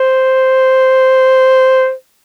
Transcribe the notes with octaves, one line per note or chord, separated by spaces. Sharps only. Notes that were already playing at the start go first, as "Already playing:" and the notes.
Already playing: C5